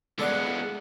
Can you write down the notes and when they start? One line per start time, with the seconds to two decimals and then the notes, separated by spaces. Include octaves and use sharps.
0.19 G#3 B3 A4 D5 F#5